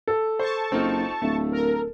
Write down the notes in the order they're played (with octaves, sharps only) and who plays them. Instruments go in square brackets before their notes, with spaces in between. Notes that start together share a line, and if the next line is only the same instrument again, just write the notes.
[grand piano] A4
[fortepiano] C5 [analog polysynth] A5 C#6
[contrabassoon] F#1 [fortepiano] C4 D#4 F4
[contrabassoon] D1 [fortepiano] A3
[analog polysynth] A#4